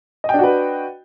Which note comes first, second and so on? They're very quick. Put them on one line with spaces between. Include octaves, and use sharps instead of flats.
D#5 G5 D4 F#4 B4